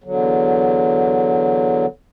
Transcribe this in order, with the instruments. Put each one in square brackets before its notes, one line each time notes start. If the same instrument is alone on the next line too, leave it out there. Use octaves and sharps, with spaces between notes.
[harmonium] E2 D3 F#3